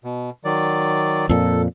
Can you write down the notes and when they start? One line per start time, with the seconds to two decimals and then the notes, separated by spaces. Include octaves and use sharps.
0.04 B2
0.45 D#3 F#3 D5
1.29 F2 A#2 A4